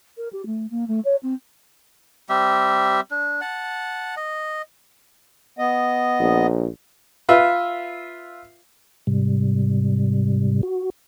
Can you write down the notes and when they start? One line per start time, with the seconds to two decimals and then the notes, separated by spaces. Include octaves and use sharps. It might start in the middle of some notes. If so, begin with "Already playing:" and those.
0.18 A#4
0.33 G4
0.46 A3
0.71 A#3
0.88 A3
1.05 C#5
1.23 C4
2.29 G3 C4 G4 E5
3.11 D4
3.41 F#5 A5
4.17 D#5
5.59 B3 D#5
6.19 A#1
7.29 F4 B4 E5
9.07 G#2 C3 G3
10.63 F#4